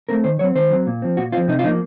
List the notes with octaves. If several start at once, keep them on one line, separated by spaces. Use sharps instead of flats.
A3 C4 A#4
D#3 C5
F#3 C4 C#5
D#3 C5
F#3 C4
A#2
F3 C4
A#2 F#4
F3 C4 F4
C3 D#4
F4
F3 A#3 D#4